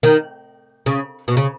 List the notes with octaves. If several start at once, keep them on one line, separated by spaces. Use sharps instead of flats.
D#3
C#3
B2
C#3